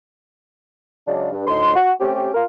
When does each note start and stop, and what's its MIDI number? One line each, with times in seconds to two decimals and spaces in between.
1.07 1.29 49
1.07 1.29 54
1.07 1.29 56
1.07 1.29 62
1.32 1.45 43
1.47 1.73 38
1.47 1.73 45
1.47 1.73 63
1.47 1.73 84
1.76 1.92 66
2.00 2.30 57
2.00 2.30 60
2.00 2.30 61
2.00 2.30 67
2.34 2.44 65
2.34 2.44 70